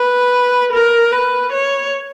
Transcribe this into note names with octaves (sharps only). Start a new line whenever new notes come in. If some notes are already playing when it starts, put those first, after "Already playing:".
Already playing: B4
A#4
B4
C#5